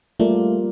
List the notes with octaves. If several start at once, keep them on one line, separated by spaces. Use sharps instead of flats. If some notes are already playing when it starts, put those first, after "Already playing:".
G3 A3 A#3 F4 A#4 D5